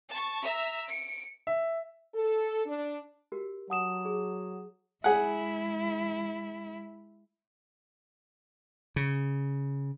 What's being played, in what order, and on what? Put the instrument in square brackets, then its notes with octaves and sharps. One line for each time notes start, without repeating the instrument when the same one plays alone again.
[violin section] A5 C#6
E5 A#5 E6
C#7 D7
[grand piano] E5
[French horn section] A4
D4
[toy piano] F#4 G4 A#4
[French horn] F#3 [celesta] F#5 D#6 E7 [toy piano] A5
[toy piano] G#4
[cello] G#3 E4 [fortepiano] G#4 F#5
[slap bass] C#3